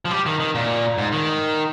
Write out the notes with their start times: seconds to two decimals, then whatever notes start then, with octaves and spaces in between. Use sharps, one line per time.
0.05 F3
0.11 G3
0.26 D#3
0.40 D#3
0.55 A#2
0.98 G#2
1.12 D#3